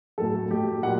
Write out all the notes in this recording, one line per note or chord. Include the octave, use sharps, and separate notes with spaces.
A2 F#3 A4
A2 F#3 G4
A#2 F#3 F#5